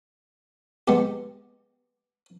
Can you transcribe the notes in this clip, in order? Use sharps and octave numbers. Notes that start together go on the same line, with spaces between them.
G#3 B3 G4